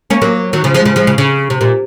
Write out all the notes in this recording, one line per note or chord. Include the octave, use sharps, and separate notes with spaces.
A#3 C#4
F#3 A#3
D#3 F#3
C#3 F3
F3 G#3
C#3 F3
F3 G#3
C#3
C#3
C3
A#2